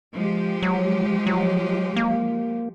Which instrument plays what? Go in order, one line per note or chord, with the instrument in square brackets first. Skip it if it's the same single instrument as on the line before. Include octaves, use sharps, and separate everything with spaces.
[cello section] F3 G#3 G4
[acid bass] F#3
F#3
A#3